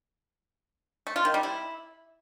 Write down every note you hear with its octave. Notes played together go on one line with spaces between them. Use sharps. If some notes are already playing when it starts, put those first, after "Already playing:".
A3
F4
D#3
G3
E4